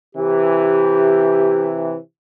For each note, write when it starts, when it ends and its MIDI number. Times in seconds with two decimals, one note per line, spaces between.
0.15 1.95 48
0.15 1.95 52
0.15 1.85 67